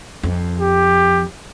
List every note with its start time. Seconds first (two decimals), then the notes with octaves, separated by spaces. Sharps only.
0.23 F2
0.59 G4